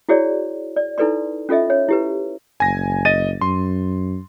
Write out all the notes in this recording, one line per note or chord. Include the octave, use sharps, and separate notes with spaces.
E4 F#4 G#4 C#5 D5
D5
D#4 E4 A4 B4 D5 C6
C#4 F4 A4 D#5 E5
C#5
E4 G4 B4
F#1 G#5 A#6
D#5 A6 D#7
F#2 C6